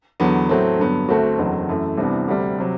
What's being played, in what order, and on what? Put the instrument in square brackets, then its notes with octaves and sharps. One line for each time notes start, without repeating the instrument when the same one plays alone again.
[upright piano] E2 D3 F#3 B3
A2 F#3 A3 C4
G2 D3 F#3 B3
D2 D3 A3 C4 F#4
F#1 E2 D3 F#3 C4
F#2 E3 A3
C2 C3 E3 B3 D4
D2 C3 G3
C3 F#3